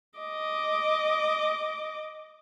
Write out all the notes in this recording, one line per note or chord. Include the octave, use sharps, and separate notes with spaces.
D#5 D6